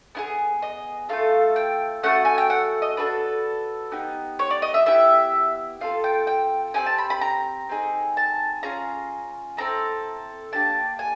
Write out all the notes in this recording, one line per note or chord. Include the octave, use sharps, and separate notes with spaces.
B3 E4 G#4
D#5
A3 C4 F4 A4 F5
G5
A3 C#4 F#4 A4 F#5
G#5
G5
F#5
D#5
D4 F#4 A4 B4
B3 D#4 G4
C#5
D5
D#5
E5
B3 E4 G4 E5
C4 F4 A4 F5
G5
G5
C4 E4 G4 G#5
A5
B5
B5
A#5
C4 D#4 G#4
A5
C#4 F4 G#4 A#5
C4 E4 A4 A#5
A#3 D4 G4 A5
G#5